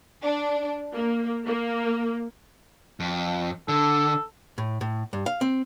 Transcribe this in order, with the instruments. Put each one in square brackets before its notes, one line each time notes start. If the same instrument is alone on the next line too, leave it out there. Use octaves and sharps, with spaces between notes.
[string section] D4
A#3
A#3
[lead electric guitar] F2
[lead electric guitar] D3 [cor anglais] A4
[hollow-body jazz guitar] A2
A2
G2
F5
C4